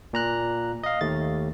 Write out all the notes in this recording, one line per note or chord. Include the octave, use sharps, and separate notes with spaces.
A#2 A#5 F#6
D#5 F5
D#2 A3 A6